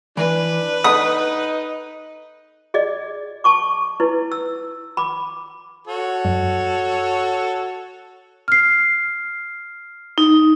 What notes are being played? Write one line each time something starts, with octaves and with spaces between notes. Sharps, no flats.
E3 D4 B4
D#4 A4 F#5 B5 D#6
G#4 D5 D#5
A5 C#6 D6
D#4 E4 B4
E6
B5 D6
F#4 A4 C#5
F#2
F6 C7
D#4